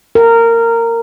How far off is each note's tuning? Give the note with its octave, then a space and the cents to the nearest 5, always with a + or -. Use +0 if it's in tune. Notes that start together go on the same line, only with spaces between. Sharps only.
A#4 -15